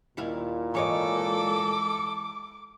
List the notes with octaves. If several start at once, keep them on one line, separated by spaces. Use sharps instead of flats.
D#2 A#2 E4 F5
E3 G#3 A4 C#5 D#5 D6